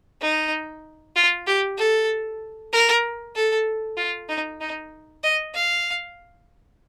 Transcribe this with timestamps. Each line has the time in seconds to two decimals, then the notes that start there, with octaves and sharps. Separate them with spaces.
0.22 D#4
1.16 F4
1.47 G4
1.78 A4
2.73 A#4
3.36 A4
3.97 F4
4.29 D#4
4.61 D#4
5.24 D#5
5.55 F5